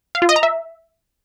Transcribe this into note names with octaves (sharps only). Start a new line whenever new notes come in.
F5
F4
D#5
A#5
E5